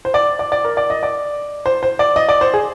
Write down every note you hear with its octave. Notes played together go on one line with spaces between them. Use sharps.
C5
D5
D5
D5
A#4
D5
D#5
D5
C5
C5
D5
D#5
D5
C5
G#4